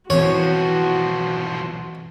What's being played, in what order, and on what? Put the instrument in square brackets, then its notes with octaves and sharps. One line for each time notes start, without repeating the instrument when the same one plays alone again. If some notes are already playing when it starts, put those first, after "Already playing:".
[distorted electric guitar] B1 F3 [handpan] E3 C4 [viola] F#4 [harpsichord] C#5